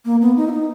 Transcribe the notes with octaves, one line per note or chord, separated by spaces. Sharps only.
A#3
B3
D#4
E4
D#4